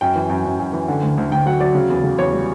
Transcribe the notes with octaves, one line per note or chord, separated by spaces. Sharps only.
F#2 G5
E3
F#2
F#2
F#2
E3
D3
D2
D2
D2 G5
F#3 F#5
F#3 D5
C#3
E2
C#3
E2 C#5
G3